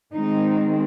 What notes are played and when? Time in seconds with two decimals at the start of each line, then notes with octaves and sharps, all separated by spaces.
0.14 D#3 G#3 C4 D#4